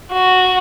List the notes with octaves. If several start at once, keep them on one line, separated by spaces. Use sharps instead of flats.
F#4